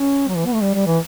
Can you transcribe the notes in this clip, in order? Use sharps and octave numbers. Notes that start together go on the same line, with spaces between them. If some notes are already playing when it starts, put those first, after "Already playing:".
Already playing: C#4
F#3
E3
B3
A3
G3
G3
E3